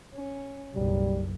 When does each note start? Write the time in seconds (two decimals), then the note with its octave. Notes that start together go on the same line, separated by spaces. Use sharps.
0.14 C#4
0.75 F#1 B1 G3